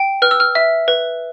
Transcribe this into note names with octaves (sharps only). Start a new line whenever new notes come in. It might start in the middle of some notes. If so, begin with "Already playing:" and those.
Already playing: G5
B4 F6
E6
F6
E5
B4